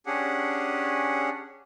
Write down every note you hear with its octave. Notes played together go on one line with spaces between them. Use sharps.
C#4 D4 G4 G#4 F#5